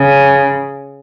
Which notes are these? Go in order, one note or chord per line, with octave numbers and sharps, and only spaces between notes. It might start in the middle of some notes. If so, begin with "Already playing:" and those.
Already playing: C#3